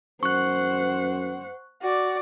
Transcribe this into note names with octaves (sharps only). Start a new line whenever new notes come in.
F#2 C5 F#5 C#6 F#6
F#4 D5